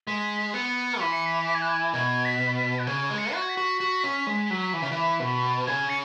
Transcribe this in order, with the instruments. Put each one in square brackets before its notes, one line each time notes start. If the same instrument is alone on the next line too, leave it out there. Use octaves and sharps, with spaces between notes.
[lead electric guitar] G#3 [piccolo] B6
[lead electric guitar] B3 [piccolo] C#7
[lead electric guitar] E3 [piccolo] B6
[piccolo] C#7
B6
B6
G#6
F#6
G#6
[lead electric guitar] B2 [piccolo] G#6
[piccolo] B6
B6
F#6
[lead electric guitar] C#3 [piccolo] G#6
[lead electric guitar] G#3
[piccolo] C#7
[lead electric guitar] F#4 [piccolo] F#6
[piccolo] G#6
B6
[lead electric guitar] F#4
F#4
C#4
G#3
F#3
E3
C#3
E3
B2
[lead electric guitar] C#3 [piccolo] G#6
[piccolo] C#7